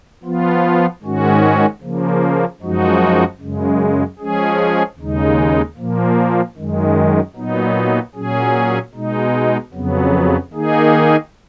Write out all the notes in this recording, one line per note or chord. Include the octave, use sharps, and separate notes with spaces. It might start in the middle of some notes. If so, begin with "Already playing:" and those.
F3 B3 F4
G#2 D#3 G#3 C#4 F#4
C#3 F3 A#3
F#2 F3 G#3 D#4 F#4
F#2 C#3 G#3
F3 G#3 C#4 G#4
D#2 C#3 G#3 D#4
A#2 F3 A#3
F#2 D#3 G#3
A#2 F#3 B3 D#4
A#2 F#3 C#4 G#4
B2 G#3 D#4
F2 C#3 F#3 B3
D#3 A#3 D#4 G#4